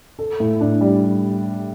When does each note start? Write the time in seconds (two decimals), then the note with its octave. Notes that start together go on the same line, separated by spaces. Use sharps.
0.19 A4
0.40 A2
0.61 D4
0.81 G3